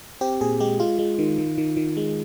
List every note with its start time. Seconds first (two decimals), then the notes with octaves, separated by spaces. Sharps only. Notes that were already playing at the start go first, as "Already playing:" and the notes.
0.21 C4 G4
0.41 A#2 G#4
0.60 G#3 G4
0.80 G#3 F4
0.99 G#3
1.19 D#3
1.38 D#3
1.58 D#3
1.77 D#3
1.97 G#3